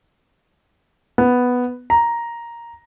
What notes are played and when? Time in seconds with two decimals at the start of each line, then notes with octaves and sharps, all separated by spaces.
1.18 B3
1.90 A#5